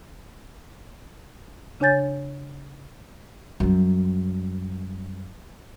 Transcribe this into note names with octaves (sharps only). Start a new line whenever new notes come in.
C#3 D4 C#5 G#5 G6 A6
F#2 G3